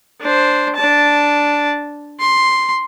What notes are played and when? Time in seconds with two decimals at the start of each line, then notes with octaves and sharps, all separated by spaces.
0.21 D4 C5
0.76 D4 A5
2.20 C6